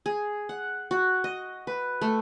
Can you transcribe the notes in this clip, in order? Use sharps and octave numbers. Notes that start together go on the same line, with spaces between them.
G#4
F#5
F#4
D#5
B4
A3